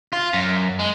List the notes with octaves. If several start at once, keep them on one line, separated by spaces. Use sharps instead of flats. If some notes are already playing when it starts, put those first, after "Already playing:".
F4
F#2
G#3